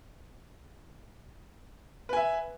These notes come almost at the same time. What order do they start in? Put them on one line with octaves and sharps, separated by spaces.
B4 G#5 E5